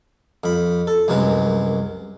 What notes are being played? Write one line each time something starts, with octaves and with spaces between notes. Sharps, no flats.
F2 B5
A4
C2 F#2 F#3 G#3 B4